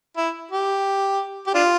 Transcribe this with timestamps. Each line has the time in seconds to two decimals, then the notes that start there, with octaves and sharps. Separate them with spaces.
0.17 E4
0.51 G4
1.47 G4
1.54 D4 F4